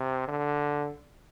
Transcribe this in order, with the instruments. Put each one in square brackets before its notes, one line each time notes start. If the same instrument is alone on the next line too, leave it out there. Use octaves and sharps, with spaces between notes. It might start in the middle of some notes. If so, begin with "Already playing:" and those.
Already playing: [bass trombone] C3
D3